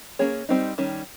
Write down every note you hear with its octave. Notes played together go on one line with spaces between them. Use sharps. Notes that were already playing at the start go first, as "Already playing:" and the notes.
A#3 C#4 G#4 C#5
G3 C4 D#4
D#3 G3 C#4